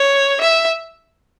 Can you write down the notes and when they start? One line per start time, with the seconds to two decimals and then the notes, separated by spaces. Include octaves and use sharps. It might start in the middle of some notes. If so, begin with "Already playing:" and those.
Already playing: C#5
0.41 E5